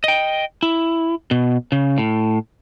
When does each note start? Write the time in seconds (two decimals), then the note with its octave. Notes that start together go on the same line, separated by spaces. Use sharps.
0.04 D#5 G5
0.63 E4
1.31 B2
1.72 C#3
1.98 A2